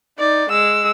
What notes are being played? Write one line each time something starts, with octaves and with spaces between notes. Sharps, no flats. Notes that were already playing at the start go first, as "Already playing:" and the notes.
D#4 D5
G#3 E6